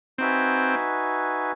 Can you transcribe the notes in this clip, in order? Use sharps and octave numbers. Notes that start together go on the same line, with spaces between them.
C4 D#4 F#4 B4 E5 G#5